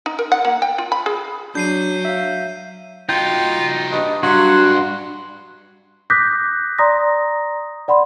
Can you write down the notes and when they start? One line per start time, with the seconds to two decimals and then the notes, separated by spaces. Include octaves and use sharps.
0.06 D#4
0.19 A#4
0.32 F#5
0.45 A#3
0.62 G5
0.78 F4
0.92 B5
1.06 G#4
1.55 F#3 D4 G6 C7 D#7
2.05 E5 F5
3.09 D#4 F4 F#4 G5
3.91 G2 D#5
4.23 G2 F#3 F#4 C6
6.10 D6 D#6 F#6 G6 A#6 B6
6.78 D5 A#5 C6 D#6 A#6
7.88 D5 F#5 B5 C6